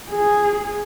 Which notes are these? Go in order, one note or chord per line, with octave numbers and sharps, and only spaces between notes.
G#4